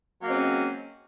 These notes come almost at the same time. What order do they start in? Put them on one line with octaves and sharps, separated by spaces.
F#3 A#3 G#3 C#4 C4